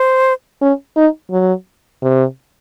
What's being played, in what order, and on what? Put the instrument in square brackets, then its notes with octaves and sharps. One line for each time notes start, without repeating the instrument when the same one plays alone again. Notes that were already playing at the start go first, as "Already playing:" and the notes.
Already playing: [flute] C5
[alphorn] C#4
D#4
F#3
C3